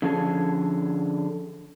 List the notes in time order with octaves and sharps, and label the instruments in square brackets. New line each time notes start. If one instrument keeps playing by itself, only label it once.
[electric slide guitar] D3 F3 C#4 G#4 A4